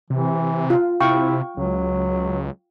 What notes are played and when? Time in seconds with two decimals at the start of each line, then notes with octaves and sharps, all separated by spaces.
0.10 C3 E3
0.70 F4
1.00 C3 E4 F5 G5 C#6
1.57 C#2 F#3